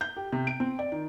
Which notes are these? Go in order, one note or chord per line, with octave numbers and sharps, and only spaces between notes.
G6
G4
C3
D7
C4
D5
D#3